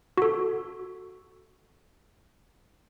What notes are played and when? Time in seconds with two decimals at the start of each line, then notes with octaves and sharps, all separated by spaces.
0.18 F#4 A4